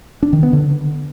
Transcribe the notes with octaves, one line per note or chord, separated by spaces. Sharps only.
D4
D#3
B3
D3